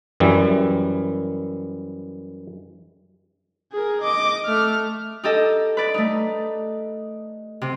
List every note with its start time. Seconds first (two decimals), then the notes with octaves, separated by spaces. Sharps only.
0.20 F#2 E3 G3
3.72 G#4 A#4
4.01 D#5 D6
4.46 A3 F6
5.24 D#4 G4 A4 D#5
5.77 B4 D5
5.94 A3 D#4
7.62 C3